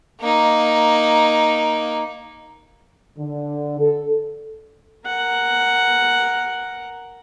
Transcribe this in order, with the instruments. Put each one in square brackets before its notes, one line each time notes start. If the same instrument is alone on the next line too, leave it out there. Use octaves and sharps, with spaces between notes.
[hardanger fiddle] A#3 D#4
[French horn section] D3
A4
[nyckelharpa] A#4 F#5